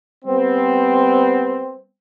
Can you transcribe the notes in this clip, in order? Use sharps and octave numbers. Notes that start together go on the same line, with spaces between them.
G3 B3 C4